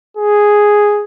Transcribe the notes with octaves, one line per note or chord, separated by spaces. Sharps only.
G#4